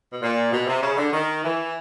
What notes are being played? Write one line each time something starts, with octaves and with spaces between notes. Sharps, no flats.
B2
A#2
B2
C3
C#3
D3
D#3
E3